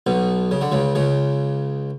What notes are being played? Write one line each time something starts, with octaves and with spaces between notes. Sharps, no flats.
B1 B2
C#3
D3
C#2 C#3
C#2 C#3